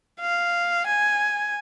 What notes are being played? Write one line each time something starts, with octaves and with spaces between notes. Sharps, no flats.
F5
G#5